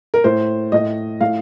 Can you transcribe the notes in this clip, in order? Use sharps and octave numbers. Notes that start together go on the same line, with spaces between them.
A#4
A2 C5
A2 D#5
A2 F5